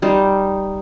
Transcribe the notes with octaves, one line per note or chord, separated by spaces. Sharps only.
G3 D#4 C5